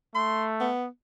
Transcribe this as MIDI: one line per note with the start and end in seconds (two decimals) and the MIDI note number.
0.15 0.71 57
0.15 0.45 84
0.60 0.87 59